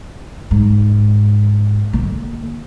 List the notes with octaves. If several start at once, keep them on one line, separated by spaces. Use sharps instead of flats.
G#2
D3 A#3